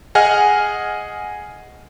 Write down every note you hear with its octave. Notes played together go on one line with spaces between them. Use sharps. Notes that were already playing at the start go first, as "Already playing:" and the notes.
G#4 D#5 F#5 G#5 F6